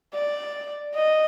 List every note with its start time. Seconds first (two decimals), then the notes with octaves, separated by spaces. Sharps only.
0.15 D5
0.96 D#5